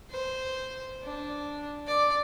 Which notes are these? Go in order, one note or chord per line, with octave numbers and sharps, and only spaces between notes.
C5
D4
D5